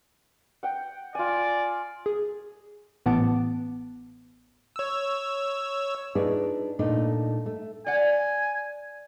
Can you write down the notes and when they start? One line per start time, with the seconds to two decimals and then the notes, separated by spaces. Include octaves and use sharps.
0.63 F#5 G5
1.15 F4 D5 G#5
2.06 G#4
3.06 A1 A2 B3 F#5 A5 D6
4.76 C#5 E6
6.15 D4 D#4 F4 G#4 B4 D5
6.79 A#2 A3 D4 D#4
7.46 A3
7.86 D5 F#5 G#5